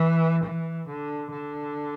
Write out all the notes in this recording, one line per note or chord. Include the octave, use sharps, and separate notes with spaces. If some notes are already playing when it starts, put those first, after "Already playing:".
Already playing: E3
E3
D3
D3